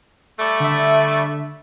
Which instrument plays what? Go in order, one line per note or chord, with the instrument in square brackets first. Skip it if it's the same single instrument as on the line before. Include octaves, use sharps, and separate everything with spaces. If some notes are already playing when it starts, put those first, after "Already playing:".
[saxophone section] G3 A3
[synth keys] D3 E5